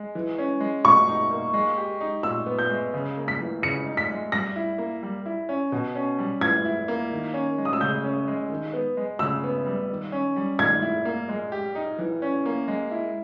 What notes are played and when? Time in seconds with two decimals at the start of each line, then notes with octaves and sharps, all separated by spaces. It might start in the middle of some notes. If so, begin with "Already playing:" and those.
Already playing: G#3
0.15 E3
0.38 C#4
0.60 G#3
0.85 B2 C#6
1.08 D#4
1.31 A#3
1.54 G#3
1.77 G4
2.01 D#4
2.23 A#2 E6
2.46 B3
2.59 G6
2.70 G#3
2.94 C#3
3.17 A#3
3.28 B6
3.40 E3
3.62 C#3 C#7
3.86 D#4
3.97 B6
4.09 G#3
4.32 G3 A#6
4.56 E4
4.78 A#3
5.03 G3
5.26 E4
5.49 C#4
5.72 B2
5.95 C#4
6.19 G3
6.41 E3 G#6
6.65 E4
6.88 A#3
7.11 D#3
7.34 C#4
7.58 G#3
7.65 D#6
7.73 E6
7.80 C#3 G6
8.04 C#4
8.28 G#3
8.50 D#3
8.73 B3
8.97 G#3
9.19 C#3 E6
9.44 B3
9.66 G3
9.90 D#3
10.12 C#4
10.36 G3
10.59 D#3 G#6
10.82 E4
11.05 A#3
11.29 G#3
11.52 G4
11.75 D#4
11.98 E3
12.22 C#4
12.46 A#3
12.68 G#3
12.91 E4